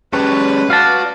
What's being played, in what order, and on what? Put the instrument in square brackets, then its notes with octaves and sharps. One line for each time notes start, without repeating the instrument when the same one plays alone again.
[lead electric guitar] G#3 G4 [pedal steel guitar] C#4 C#5 A5 [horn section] B4
[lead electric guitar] F#4 [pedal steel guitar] D5 [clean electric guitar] F5 A5